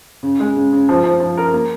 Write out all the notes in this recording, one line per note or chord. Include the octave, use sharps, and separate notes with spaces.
C#3
G#3
C#3
C#3
F3
F3
F3
A#4
A#3